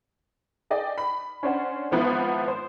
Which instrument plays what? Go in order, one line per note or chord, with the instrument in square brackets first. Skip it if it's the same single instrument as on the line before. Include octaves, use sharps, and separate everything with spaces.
[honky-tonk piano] G#4 D5 D#5 G5
B5
C#4 D4 C5 F#5
G#1 F3 B3 E4 B4
C5